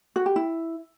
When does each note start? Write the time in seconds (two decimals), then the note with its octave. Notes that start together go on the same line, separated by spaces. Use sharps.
0.16 F#4
0.26 G4
0.36 E4